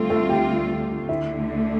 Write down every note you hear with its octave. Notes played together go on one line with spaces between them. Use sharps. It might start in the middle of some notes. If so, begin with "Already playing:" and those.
Already playing: D2 D3 G3 A3 C4 F4 A4
A3 A4
G4 G5
D2 D3 A3 E4 E5